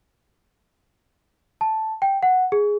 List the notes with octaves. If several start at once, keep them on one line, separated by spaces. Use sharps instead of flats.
A5
G5
F#5
G#4